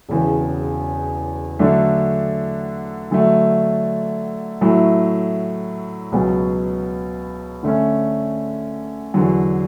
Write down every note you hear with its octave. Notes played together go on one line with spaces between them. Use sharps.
E1 E2 C#3
D3 F#3 A3 D4
D3 F#3 A3
A2 F#3 A3
C#2 B2 F#3
D3 A3 C#4
E2 D3 F#3